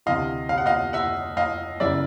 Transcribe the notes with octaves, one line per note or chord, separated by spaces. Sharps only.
D2 C3 E3 D#5 F5
F5
F#5
D#5 F5
E5 F#5
D#5 F5
F#2 C#3 E3 D5 E5